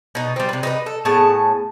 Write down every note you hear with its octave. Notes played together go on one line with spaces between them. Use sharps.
B2 D#4
G3 C4
C3 B4
D#4 G4 B4
A4
A2 B3 G#4 A5